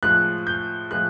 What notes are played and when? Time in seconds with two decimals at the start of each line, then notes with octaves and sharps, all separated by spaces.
0.03 A2 F3 G#3 F#6
0.47 G6
0.91 A2 F3 G#3 F#6